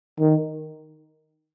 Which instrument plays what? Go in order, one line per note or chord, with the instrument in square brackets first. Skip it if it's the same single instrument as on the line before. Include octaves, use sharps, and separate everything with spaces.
[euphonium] D#3